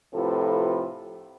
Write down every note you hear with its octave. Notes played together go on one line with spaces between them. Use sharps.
A2 C3 F3 F4 A4 B4